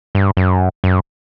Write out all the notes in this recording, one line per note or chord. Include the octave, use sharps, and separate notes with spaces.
G2
F#2
F#2